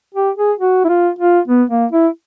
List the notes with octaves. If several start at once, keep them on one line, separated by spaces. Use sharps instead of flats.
G4
G#4
F#4
E4
F4
F4
B3
A#3
E4